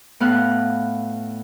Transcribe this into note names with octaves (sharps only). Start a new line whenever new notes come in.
A2 B3 F5 F#6